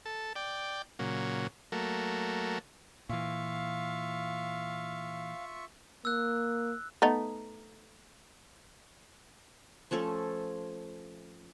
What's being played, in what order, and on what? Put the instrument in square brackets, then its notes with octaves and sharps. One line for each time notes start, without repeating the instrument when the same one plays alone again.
[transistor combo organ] A4
D5 G5
A#2 C#3 F#3
F#3 A3 A#3
[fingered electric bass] A#2 E3 [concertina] F4 E5 C#6 [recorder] F5
[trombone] A#3 [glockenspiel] E6 F#6
[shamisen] A3 B3 D#4
[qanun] F3 A3 C#4 A4